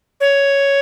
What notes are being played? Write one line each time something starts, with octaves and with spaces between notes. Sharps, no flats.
C#5